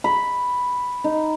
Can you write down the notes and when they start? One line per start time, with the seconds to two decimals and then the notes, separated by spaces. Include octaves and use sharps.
0.04 B5
1.04 D#4